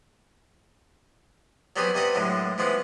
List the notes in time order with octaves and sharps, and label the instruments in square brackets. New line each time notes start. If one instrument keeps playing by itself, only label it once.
[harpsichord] F#3 G3 B3 C4 G4 G#4
C3 G3 B4 D#5 F#5
F#2 A2 D3 G#3
E3 F3 G#3 B3 C4